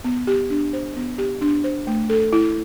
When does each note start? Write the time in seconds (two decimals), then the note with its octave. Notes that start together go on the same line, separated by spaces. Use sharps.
0.05 B3
0.27 G4
0.50 D4
0.73 C5
0.96 B3
1.18 G4
1.41 D4
1.64 C5
1.87 A3
2.10 A4
2.33 E4